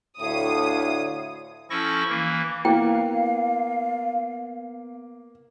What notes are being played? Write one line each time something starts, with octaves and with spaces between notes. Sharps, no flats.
D2 A2 C#5 E5 F5 D#6
F3 C#4 E4 A4 C#6 A#6
E3 A#3
A#3 B3 E4 F5 G5